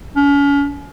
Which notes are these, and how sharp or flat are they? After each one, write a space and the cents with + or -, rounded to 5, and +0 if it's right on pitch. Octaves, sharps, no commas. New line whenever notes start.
C#4 +35